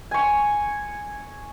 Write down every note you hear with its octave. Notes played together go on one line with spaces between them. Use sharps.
G#5 C#6